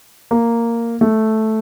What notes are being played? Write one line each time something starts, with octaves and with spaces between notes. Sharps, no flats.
A#3
A3